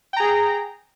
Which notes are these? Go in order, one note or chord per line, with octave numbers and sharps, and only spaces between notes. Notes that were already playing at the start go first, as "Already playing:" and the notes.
G#4 G5 A#5